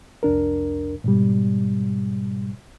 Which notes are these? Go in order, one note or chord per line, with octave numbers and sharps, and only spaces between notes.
C2 F2 D4 A#4
G#2 B2 G3